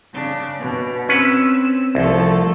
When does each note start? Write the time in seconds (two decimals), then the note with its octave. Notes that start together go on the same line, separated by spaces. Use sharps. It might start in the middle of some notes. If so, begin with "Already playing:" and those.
0.13 C#3 D4
0.58 B2
1.09 C4 C#4 B4 E6
1.95 C2 F3 A3